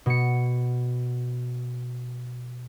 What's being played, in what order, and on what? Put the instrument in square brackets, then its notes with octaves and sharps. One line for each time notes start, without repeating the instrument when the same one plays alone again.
[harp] B2 C#7